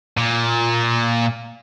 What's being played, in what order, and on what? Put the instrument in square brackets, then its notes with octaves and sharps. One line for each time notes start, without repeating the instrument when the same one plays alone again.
[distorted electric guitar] A#2